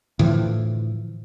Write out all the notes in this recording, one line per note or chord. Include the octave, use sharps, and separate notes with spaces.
A2 D3 E3 F3